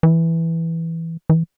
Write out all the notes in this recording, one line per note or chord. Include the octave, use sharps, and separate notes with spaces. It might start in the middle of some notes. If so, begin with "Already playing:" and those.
E3
E3